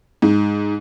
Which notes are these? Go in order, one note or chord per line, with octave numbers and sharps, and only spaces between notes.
G#2